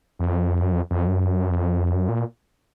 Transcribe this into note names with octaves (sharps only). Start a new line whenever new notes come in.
F2
F#2
F2
F2
F#2
F2
F#2
A#2